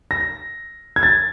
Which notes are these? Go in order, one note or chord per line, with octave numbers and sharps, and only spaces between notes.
A#6
G#6
A6